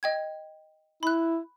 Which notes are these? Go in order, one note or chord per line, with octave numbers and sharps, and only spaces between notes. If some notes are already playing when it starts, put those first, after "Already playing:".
D#5 G5 G#6
E4 B5 F#6